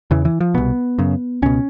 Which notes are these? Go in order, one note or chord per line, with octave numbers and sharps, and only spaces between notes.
E2 C#3 E3
E3
F3
C2 B2 B3
F#2 C#3
C#2 B2 C#4